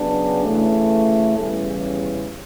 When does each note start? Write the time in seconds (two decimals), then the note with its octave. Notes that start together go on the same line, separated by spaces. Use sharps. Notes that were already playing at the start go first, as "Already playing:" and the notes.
Already playing: C#3 F#3 B3 D4
0.43 C#3 E3 A3
1.37 E2 C#3 E3 G3 C#4